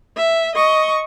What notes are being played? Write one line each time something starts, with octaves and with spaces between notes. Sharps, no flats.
E5
D#5 C#6